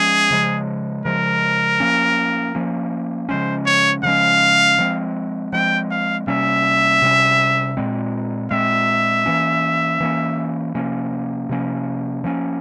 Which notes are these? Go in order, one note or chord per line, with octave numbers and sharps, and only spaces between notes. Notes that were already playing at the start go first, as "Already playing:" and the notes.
Already playing: F3 G#3 C#4 G#4
C#3 F3 G#3
C#3 F3 G#3 A#4
F3 A#3 C#4
F3 A#3 C#4
C#3 F3 G#3 C#4 C5
C#5
C#3 F3 G#3 C#4 F5
F3 G#3 C4
F3 G#3 C4 G5
F5
C3 G3 A#3 C#4 E5
C3 G3 A#3 C#4
A#2 G#3 C4
A#2 G#3 C4 E5
E3 A#3 C#4
E3 A#3 C#4
C3 F3 A#3 C#4
C3 F3 A#3 C#4
F3 A#3 C#4